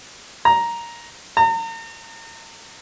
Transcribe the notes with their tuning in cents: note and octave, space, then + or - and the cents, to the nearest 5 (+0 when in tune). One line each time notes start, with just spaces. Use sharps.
A#5 +5
A#5 -40